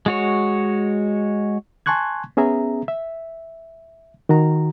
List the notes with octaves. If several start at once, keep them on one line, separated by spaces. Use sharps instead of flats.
G#3 F#4 C#5
G#5 A5 C6 C#6 F#6 G#6
B3 C#4 G#4 E5 A#5
E5
D#3 F#4 A#5